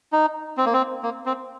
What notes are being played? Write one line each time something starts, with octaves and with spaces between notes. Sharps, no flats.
D#4
C4
A#3
C4
A#3
C4